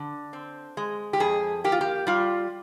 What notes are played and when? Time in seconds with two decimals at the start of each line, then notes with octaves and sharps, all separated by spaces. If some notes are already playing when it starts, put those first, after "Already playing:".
Already playing: D3
0.33 C4
0.77 G#3
1.13 G4
1.20 F2 G#4
1.64 A#3 G4
1.72 F4
1.81 G4
2.07 G3 F4